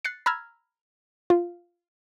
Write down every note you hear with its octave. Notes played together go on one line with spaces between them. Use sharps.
F#6 A6 C7 C#7
A#5 B5 E6 F6 G#6
F4